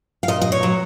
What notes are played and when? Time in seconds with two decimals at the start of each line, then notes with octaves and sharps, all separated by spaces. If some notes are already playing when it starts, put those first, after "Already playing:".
0.23 F5
0.28 A#2 D#5
0.42 D#5
0.52 C#5
0.63 F#3